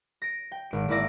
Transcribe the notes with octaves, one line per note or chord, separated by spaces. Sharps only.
A#6 D7
G5
G#1 D7
G#1 A#3 E4 D5 A#6 D7